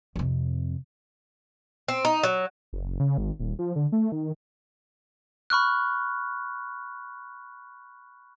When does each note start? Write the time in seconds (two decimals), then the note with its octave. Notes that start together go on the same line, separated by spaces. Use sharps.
0.16 F2 C3
1.88 C4
2.05 D#4
2.23 F#3
2.73 F#1
3.00 C#3
3.18 G#1
3.39 D#1
3.59 F3
3.76 D3
3.92 A3
4.12 D#3
5.50 B5 C#6 F6 F#6